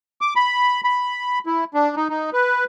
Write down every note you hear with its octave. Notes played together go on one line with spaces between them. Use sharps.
D6
B5
B5
E4
D4
D#4
D#4
B4